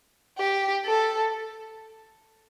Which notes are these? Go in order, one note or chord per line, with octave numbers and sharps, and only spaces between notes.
G4
A4